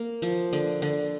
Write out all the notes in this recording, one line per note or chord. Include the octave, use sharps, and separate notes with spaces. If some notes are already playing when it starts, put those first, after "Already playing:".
Already playing: A#3
F3
D3
D3